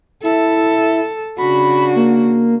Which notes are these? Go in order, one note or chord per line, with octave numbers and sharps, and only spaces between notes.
E4 A4
C#3 D4 F#4 B5
A#3